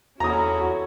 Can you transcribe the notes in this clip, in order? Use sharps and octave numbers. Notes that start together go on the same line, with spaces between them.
E2 C#4 E4 F#4 A4 A#5 D#6